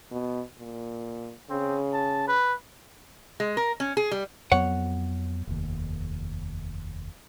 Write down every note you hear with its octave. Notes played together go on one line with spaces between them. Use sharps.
B2
A#2
C#3 C4
A5
B4
G#3
A#4
C#4
G#4
G3
F2 F#3 B3 C#5 F#5
F1 D#2